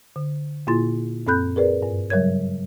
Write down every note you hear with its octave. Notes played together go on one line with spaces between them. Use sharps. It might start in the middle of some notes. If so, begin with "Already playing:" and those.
D3
A#2 A#3 E4 F4 C6 A6
F#2 C4 A4 B5 F#6 G6
G#4 A#4 B4 D5
G2
C#3 F#3 G3 A#4 C#5 G#6